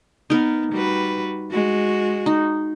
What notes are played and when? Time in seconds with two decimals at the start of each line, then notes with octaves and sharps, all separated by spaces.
0.30 B3 D#4 A#4
0.72 G3 F#4 B4
1.51 G#3 F#4
2.26 D#4